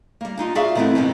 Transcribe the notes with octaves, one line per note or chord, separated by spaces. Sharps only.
G3 A#3
D4 D#4 F4
F4 F#4 G#4 D5 E5 F5
D#3 E3 A3 B3 C4 E4
F2 G#2 C3 D#3